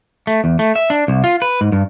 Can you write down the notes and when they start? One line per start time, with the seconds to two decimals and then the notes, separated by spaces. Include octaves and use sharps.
0.27 A3
0.44 E2
0.59 A3
0.76 E5
0.90 D4
1.08 C2
1.24 F4
1.42 B4
1.61 G#2
1.72 G2